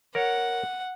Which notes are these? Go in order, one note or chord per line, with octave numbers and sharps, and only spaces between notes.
A#4 C#5 F#5